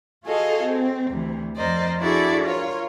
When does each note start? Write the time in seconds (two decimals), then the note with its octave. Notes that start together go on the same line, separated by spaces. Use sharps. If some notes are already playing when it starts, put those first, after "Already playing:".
0.24 F4 F#4 G#4 A4 D#5 F5
0.63 C4
1.11 D2 C3 E3
1.56 F2 A#4 C5 D5 D#5
1.99 D4 E4 F#4 G#4 A4 D5
2.46 F4 A#4 C#5